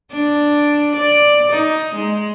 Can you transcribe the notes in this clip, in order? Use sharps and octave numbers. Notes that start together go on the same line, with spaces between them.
D4
D5
D#4
G#3